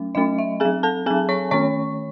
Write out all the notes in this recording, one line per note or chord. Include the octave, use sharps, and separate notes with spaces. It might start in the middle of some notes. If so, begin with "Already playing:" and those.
Already playing: F#3 A3 C#4
F#3 A3 C#4 D#5
E5
C4 G#4 G#5
F#3
A4 A5
F#3 C4 G#4 G#5
C#5 C#6
D#3 A3 C#4 C#5 C#6